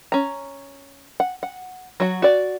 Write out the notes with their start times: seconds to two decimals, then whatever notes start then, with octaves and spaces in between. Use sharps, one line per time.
0.12 C#4 A#5
1.20 F#5
1.43 F#5
2.00 F#3 F#4
2.22 F#4 D5